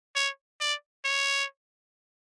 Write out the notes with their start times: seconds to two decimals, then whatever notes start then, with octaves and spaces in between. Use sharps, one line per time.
0.15 C#5
0.60 D5
1.04 C#5